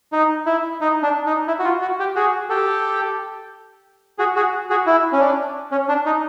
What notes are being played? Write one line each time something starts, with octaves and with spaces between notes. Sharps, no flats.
D#4
E4
D#4
D4
D#4
E4
F#4
F4
F#4
G4
F#4 G#4
G4 A4
F#4 G#4
F#4 G#4
F#4 G#4
E4
C#4
D4
C#4
D4
D#4